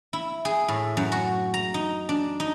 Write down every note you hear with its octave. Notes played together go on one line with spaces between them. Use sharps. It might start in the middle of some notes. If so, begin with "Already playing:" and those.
E4
G#4
A2
F#2
F#4
A#5
D#4
D4
D#4